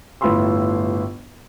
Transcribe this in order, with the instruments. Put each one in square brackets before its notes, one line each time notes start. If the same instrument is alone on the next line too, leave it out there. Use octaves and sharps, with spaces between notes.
[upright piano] G1 A2 F4 B5 C6 E6